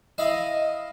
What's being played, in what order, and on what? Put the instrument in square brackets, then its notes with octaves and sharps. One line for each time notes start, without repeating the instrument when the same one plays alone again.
[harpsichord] E4 F5 B5 [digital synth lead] D#5